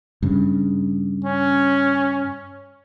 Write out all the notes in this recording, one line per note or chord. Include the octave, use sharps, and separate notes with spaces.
G2 C#3
C#4